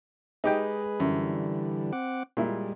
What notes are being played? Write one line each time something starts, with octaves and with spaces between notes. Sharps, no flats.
G#3 D#4 G4 G#4 B4 G5
F#2 D3 E3 G3
C4 F#5 D6
A#2 G3 G#3 E4